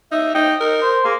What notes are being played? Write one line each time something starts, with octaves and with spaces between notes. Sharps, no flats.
D#4 E5
D#4 G5
D#4 A#4
C5
A#3 G#4